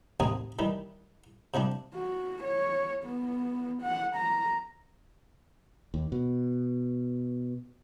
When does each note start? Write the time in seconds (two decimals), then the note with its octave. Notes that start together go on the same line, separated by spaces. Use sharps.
0.20 A1 D#2 C4 G#4 A#5 D#6
0.59 D#3 E3 G3
1.54 C3 F3 G3 D4
1.95 F#4
2.44 C#5
3.05 B3
3.82 F#5
4.16 A#5
5.94 D#2
6.12 B2